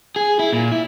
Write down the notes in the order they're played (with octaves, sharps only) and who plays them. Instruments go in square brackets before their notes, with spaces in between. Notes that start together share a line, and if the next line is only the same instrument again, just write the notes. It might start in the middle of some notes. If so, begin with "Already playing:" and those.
[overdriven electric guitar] G#4
E4
A#2
E4